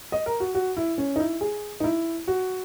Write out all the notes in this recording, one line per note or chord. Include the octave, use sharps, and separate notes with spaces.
D#5
A#4
F#4
F#4
E4
C#4
D#4
E4
G#4
D#4
E4
F#4